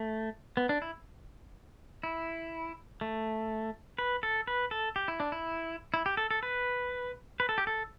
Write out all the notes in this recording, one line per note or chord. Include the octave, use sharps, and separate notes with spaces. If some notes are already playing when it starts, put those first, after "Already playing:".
Already playing: A3
B3
D4
E4
E4
A3
B4
A4
B4
A4
G4
E4
D4
E4
E4
G4
A4
A4
B4
B4
A4
G4
A4